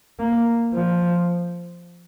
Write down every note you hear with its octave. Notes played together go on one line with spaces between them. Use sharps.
A#3
F3